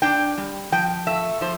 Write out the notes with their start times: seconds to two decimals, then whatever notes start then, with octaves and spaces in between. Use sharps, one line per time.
0.02 D4 G5
0.38 G3
0.72 F3 G5
1.07 A3 E5
1.41 F3 C5